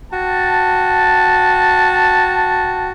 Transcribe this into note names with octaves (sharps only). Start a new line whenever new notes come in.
F#4 G5 A5